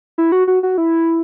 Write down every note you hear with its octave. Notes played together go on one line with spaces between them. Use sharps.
E4
F#4
F#4
F#4
E4